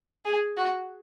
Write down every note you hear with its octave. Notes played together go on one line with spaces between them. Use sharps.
G#4
F#4